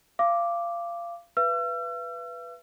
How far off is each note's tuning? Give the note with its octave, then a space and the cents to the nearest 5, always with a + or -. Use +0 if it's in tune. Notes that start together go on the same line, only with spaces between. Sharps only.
F5 -25 D6 +0
B4 +0 E5 +45 E6 +45